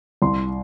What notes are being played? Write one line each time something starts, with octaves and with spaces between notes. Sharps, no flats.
C2 C6